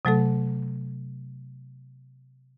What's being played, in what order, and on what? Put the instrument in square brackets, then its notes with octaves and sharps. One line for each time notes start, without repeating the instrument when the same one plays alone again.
[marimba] C3 F#3 A3 A4